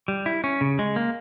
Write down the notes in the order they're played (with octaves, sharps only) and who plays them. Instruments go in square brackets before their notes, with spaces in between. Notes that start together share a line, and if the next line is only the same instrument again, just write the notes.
[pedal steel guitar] G3
E4
C#4
C#3
G#3
A#3